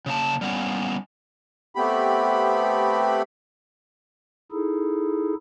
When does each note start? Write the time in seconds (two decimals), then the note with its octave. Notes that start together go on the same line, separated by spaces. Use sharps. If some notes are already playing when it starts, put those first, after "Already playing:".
0.06 C#3 A#3 A5
0.41 G3 A#3 B3 C#4
1.75 A3 B3 C4 G4 B5
4.52 D#4 E4 G#4 A4